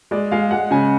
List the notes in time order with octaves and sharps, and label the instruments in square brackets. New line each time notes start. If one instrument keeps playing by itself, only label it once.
[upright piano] G#3 D5
G#3 F5
G#3 F#5
C#3 G#5